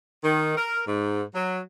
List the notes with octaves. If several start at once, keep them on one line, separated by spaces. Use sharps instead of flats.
D#3
A#4
G#2
F#3